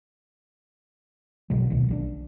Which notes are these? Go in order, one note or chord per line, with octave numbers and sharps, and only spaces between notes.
A#1 B2 F#3 G#3
D1 B1 B2 D#3
A#1 G3 D4